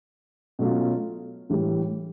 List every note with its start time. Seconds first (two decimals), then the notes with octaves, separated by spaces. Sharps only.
0.59 B2 F#3 A3 C#4 F4
1.50 A2 E3 G3